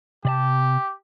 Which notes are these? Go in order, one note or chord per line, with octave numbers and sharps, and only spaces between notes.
C3 G4 D5 A5